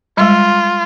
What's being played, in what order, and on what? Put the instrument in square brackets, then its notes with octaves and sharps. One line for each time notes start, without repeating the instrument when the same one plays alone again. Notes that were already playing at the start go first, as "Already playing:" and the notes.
[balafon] G3 G#3 [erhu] F4